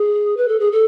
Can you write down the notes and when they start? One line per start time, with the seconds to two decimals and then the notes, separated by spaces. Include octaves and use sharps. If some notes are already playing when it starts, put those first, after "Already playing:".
Already playing: G#4
0.37 B4
0.48 A4
0.59 G#4
0.72 A4